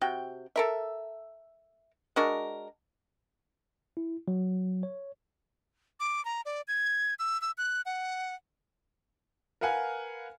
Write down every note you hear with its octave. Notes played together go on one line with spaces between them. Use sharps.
C3 F#4 G5
A4 A#4 E5
G#3 D4 F#4 A#4
E4
F#3
C#5
D6
A#5
D5
G#6
E6
E6
F#6
F#5
A#4 B4 F5 F#5 G#5